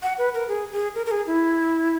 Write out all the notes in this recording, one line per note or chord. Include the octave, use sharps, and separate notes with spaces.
F#5
B4
A#4
G#4
G#4
A#4
A#4
G#4
E4